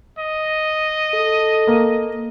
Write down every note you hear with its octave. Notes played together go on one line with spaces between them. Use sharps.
D#5
A4
A#3